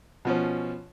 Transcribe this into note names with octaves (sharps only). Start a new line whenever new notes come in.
B2 F3 C#4